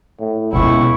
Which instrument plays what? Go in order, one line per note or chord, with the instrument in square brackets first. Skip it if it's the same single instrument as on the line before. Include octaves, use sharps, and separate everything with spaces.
[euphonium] A2
[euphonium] C#2 [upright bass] B2 B3 [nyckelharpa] E4 C#6